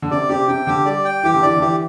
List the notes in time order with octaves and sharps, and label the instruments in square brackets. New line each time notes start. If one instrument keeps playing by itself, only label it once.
[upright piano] D3
[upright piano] C3 [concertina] D5
[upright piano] C3 [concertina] G4
[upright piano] C3 [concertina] G5
[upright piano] D3 [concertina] G4
[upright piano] G3 [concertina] D5
[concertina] G5
[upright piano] E3 [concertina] G4
[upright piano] D3
[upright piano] E3 [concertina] D5
[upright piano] D3
[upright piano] E3 [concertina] G4